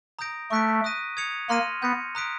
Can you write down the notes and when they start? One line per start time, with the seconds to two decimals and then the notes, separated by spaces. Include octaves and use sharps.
0.19 A#5 D#6 G6 A#6 D7
0.51 A3 C#6 F#6 B6 D7
0.84 D#6 F#6 A#6 D#7
1.17 D#6 G#6 C#7 F7
1.49 A#3 C6 F6 A#6 D#7
1.82 B3 G6 A#6 C#7
2.15 A#5 D#6 F#6 B6 D7